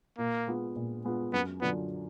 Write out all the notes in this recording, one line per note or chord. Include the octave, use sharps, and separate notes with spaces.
A#2 A#3
G#3 B3 F4
A#2
G#3 B3 F4
F#2 B3
D3 F#3 B3 D4 F4